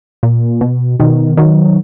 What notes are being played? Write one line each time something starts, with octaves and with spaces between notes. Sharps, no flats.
A#2
B2
B2 D#3
D#3 F#3